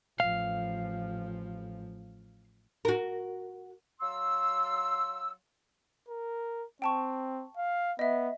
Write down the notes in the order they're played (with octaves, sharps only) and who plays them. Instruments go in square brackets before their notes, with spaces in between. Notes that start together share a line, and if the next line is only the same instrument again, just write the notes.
[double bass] A1 F3 [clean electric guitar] F5
[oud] F#4 A#4
[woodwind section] F#3 F5 C6 E6
[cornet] A#4
[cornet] C4 [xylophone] G5 A5 C#6
[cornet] F5
[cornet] B3 [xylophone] D#5 E5